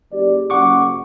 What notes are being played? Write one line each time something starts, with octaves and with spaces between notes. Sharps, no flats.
F#1 G4 D5
F#1 F#5 C#6 D6